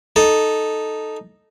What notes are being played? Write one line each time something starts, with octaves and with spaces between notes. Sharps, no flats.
D#4 A4